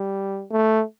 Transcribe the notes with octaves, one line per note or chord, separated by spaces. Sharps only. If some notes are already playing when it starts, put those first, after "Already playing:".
Already playing: G3
A3